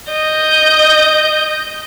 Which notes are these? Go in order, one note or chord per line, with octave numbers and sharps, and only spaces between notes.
D#5 G6